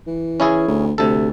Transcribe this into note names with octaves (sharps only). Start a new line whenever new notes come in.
E3
C#4 E4 G#4
D2
D2 C3 A4